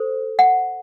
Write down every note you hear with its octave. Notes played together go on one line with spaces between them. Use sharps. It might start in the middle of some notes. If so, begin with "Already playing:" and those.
Already playing: A4 C5
F#5